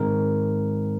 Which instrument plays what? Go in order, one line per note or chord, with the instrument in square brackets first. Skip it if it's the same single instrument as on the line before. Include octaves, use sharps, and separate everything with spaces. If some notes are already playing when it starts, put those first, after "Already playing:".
Already playing: [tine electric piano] G#2 D#3 G#3 C4 A#4